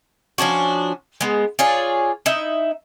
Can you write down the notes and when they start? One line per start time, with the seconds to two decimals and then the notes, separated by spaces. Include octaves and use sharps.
0.38 F3 C#4 D4 F#4
1.21 G#3 B3
1.59 F4 G#4 C#5 D5
2.26 D#4 E4 E5